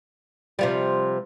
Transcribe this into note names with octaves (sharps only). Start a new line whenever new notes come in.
C3 F3 G3